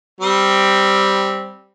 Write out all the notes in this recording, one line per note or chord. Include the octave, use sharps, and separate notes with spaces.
G3 C4